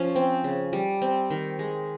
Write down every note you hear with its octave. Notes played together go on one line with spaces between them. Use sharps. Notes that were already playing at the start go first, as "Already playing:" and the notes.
Already playing: F3 C#4
C4
C#3
G3
C4
D#3
G#3